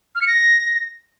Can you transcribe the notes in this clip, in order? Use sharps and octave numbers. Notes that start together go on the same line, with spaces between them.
F6
C#7
A#6